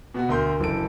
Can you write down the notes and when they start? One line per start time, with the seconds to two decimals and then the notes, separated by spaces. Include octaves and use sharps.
0.14 B2 B3 F#4
0.29 D2 A#4 C6 G6
0.60 F#1 E3 A4 D7